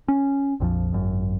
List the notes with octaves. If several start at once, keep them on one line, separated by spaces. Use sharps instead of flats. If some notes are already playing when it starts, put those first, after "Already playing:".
C#4
A#1 F2 E3 F3
G#1 F#2